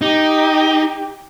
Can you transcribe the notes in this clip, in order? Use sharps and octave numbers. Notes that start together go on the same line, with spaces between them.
D#4 G4